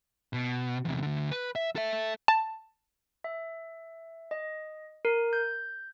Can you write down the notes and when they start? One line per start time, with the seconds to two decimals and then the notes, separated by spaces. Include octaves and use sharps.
0.33 B2
0.85 E2 C3
1.03 D2 D3
1.31 B4
1.56 E5
1.76 A4 E5
2.28 A5
3.24 E5
4.31 D#5
5.05 A#4
5.33 G6